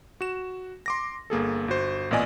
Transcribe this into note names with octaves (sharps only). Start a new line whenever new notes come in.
F#4 E7
C6 D6 A#6
G1 A#3 G#4 A4
G1 F#4 C5
A1 A#2 B3 D5 D#5 G#5